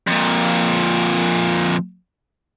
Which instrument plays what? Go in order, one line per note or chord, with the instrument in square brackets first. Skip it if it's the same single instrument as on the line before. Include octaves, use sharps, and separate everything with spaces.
[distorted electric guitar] F2 A#2